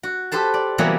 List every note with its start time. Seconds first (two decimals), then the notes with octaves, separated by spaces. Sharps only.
0.03 F#4
0.32 G4 A4 B4 C5 A5
0.54 D5
0.78 C3 E3 F#3 G3 A#3 B3